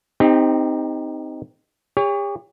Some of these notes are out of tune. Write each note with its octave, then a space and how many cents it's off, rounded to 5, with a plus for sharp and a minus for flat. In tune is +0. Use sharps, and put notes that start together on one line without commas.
C4 -10 D#4 +0 G4 +30
G4 +45 C#5 +20